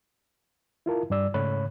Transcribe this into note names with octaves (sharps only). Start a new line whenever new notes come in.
E4 F4 A#4 A5
G2 G3 D5 E6
G#2 C#3 A3 C#5 B5 F#6